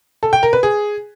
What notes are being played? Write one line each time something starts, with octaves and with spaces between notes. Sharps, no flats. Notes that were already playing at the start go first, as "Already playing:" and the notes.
A4
G5
A#4
B4
G#4